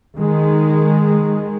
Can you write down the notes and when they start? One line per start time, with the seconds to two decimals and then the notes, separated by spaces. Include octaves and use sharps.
0.18 D#3 G#3